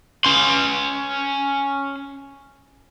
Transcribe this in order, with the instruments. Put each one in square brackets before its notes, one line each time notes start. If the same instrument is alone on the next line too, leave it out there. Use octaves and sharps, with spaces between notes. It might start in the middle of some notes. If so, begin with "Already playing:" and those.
[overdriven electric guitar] C#4 C6